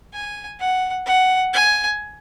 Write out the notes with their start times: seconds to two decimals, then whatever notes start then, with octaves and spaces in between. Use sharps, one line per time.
0.13 G#5
0.59 F#5
1.06 F#5
1.53 G#5